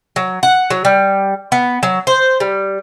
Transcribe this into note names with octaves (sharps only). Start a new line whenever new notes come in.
F#3
F#5
F#3
G3
B3
F#3
C5
G3